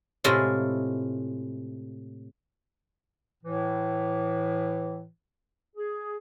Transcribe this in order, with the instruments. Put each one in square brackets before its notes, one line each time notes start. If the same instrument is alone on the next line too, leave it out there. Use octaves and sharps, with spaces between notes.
[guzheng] A2 C3 G#3 E4 F4
[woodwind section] A2 E3
G#4